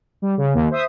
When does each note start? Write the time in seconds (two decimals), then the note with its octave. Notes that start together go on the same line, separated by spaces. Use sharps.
0.22 G3
0.38 C#3
0.54 D#2
0.71 C5 E5 D#6